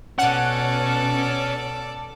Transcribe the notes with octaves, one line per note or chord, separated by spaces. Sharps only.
B2 C#4 A4 D5 F#5